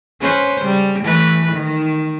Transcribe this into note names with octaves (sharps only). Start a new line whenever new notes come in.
C#4 B4 C5
C#3 G3
E3 A3 B4
D#3